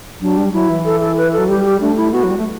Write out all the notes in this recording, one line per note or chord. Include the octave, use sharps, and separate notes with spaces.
F#3 D4
G3
F#3 E4
E3
A4
A4
B4
F#3 A4
G3 G4
G4
A3 D4
E4
B3 F#4
F#3
G3
A3